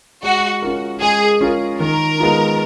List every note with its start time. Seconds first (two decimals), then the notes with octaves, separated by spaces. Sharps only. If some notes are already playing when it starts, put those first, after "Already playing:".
0.23 G#3 F#4
0.62 C#4 F4 A#4
1.02 G#3 G#4
1.41 C#4 F4 A#4
1.80 D#3 A#4
2.20 G#3 B3 F4